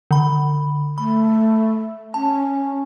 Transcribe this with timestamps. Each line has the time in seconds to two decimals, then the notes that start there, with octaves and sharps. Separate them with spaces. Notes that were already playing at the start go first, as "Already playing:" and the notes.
0.11 D3 B5
0.98 A3 B5
2.14 C#4 A5